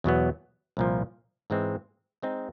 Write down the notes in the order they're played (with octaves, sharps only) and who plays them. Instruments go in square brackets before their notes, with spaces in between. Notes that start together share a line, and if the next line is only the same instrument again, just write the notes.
[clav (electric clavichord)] E2 B2 F#3 B3
C2 A#2 F3
G#2 E3 G#3 C4
G#3 C4 D#4 G#4